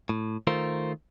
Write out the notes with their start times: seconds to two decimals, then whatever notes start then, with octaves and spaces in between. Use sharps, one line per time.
0.09 A2
0.47 D#3 A3 F4 A#4 C5